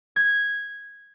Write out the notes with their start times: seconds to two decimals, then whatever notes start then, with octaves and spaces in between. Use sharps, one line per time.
0.16 G#6